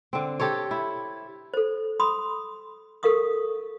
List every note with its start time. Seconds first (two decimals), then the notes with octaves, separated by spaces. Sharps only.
0.13 D3 C4
0.40 G4 A4 C5 C#5
0.71 E4
1.54 A4 C5
2.00 B5 C6 D#6
3.03 A4 A#4 F5 C#6 D#6